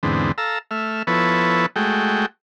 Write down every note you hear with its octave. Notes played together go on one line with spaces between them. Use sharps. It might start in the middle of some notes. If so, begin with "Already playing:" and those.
E2 G#2 D3 B3 C4
A4 F5 A#5 E6
A3 E5 F6
F3 B3 E4 A4 B4 C#5
G#3 A3 F#4 G5